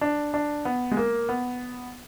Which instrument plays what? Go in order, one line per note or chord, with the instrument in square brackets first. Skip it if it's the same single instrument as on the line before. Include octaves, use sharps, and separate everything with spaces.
[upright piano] D4
D4
B3
G#3
A#3
B3